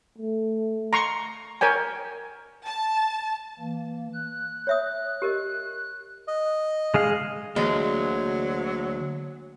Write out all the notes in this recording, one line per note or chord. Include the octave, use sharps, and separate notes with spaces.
A3
A#5 C6 C#6
A#4 C#5 G5 G#5
A5
E3 A#3
F#6
C#5 E5 D#6
G4 A#4 D#5
D#5
G#3 G#4 F5
D2 E3 F#3 G#3 A#3